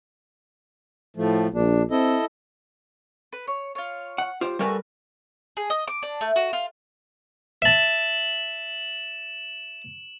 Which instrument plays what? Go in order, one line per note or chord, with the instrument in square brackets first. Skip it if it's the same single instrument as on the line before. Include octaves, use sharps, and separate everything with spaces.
[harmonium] A2 F3 A3
[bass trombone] A#1 [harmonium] D4
[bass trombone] C4 [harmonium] E4 A4 D#5
[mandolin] B4
C#5
F4 C#5
[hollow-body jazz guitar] F#5
F4 G4 C5
[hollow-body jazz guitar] G3 A#4 B4 [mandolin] A3 F#4 G#5
[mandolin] G#4
D#5
D6
D4
A3
F#4
F4
[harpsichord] E5 A5 [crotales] E7 F#7